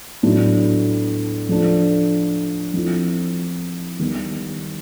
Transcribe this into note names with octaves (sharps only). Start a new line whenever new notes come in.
A2 F#3 B3 D4
F3 A3 D4
F3 A3 C4 E4
D#3 G3 B3